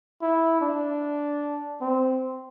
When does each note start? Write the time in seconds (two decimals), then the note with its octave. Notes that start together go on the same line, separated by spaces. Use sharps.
0.22 E4
0.61 D4
1.81 C4